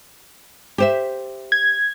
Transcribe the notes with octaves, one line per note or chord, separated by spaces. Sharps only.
G4 C5 E5
G#6